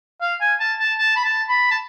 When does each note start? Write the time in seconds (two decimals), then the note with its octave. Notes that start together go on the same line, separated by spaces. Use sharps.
0.21 F5
0.41 G#5
0.60 A5
0.79 A5
0.98 A5
1.16 B5
1.24 A5
1.49 B5
1.71 A5